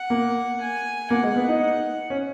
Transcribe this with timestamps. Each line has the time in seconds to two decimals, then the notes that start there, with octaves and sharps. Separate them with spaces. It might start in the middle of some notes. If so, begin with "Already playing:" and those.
Already playing: F#5
0.10 A#3
0.61 G#5
1.10 A#3 F#5
1.23 G#3
1.36 B3
1.48 D#4
1.61 F#5
2.10 C#4